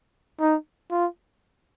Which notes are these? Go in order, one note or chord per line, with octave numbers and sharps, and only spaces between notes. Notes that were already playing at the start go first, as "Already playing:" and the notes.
D#4
F4